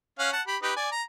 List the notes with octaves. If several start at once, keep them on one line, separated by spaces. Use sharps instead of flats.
C#4 F5 F#5
F#5 A5
G4 B5
D#4 G4 B4
D5 G#5
A#5